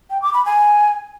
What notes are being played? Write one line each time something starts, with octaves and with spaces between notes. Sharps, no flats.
G5
D6
B5
G#5